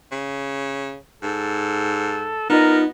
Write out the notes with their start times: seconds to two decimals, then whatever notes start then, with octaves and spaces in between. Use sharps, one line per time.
0.11 C#3
1.23 G#2 A4
2.50 B3 D#4 F4 A#4 D#5